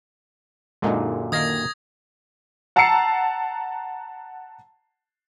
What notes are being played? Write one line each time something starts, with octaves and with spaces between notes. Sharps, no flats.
F#2 A#2 D3 G#3 D#4
D#3 A#3 D#6 G#6 A#6
F#5 A5 A#5 E6 C7 C#7